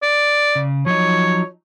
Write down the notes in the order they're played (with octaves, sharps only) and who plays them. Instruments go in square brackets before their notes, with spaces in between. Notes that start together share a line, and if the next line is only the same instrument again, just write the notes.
[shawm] D5
[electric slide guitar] C#3
[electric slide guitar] F3 F#3 D#4 [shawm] C#5